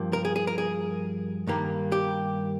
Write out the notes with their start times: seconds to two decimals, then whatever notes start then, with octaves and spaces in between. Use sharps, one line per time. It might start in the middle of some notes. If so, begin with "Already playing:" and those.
Already playing: G2 F3 A#3
0.13 A#4
0.25 G#4
0.36 G#4
0.47 A#4
0.58 G#4
1.47 G2 D#3 G3 A#3
1.92 G4